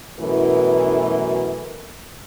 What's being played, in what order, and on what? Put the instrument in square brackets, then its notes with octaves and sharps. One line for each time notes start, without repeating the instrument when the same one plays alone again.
[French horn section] F#2 B2 E3 A3 E4 A#4